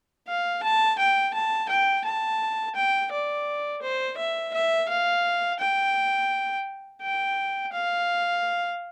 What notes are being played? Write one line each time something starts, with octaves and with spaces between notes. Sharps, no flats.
F5
A5
G5
A5
G5
A5
G5
D5
C5
E5
E5
F5
G5
G5
F5